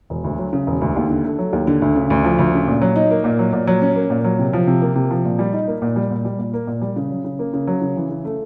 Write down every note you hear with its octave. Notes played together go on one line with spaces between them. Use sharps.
E1
D2
F#3
C#3
E1
D2
D#2
D3
A3
F#3
D#2
D3
D2
C#3
D2
F3
D2
C#3
A#2
F#3
D#4
A#3
A#2
F#3
A#2
F#3
C#4
A#3
A#2
F#3
C3
F3
C3
A#3
C3
F3
A#2
G3
D#4
A#3
A#2
G3
A#2
G3
A#2
A#3
A#2
G3
C#3
F#3
C#3
A#3
C#3
F#3
C#3
E3
C#3
A3